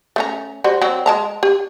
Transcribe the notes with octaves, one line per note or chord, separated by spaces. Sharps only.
A3 C#4 A#5
G3 F#4 C5
F#3 C4
G#3 A5 A#5
G4